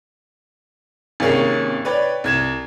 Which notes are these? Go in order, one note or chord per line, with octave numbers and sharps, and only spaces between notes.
G#1 C3 A#3 C#4 G#4
B4 C#5 D5 G5
C2 G#6 E7